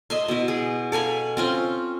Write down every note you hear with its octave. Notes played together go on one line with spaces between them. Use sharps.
D#5 E5 C6
B2 E4
G#4
A4 F5 G#5 B5
C4 C#4 F4